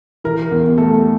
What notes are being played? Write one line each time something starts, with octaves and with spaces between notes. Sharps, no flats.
E3 A#4
E2
A3 A4